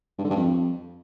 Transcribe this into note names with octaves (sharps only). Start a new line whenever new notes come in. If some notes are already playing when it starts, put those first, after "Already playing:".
G2
D3
G2
F2